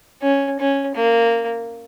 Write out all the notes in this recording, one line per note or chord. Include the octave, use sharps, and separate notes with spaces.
C#4
C#4
A#3